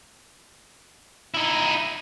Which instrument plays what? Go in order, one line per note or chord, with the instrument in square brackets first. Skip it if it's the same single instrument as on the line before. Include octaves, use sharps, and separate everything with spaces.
[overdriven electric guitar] D#4 E4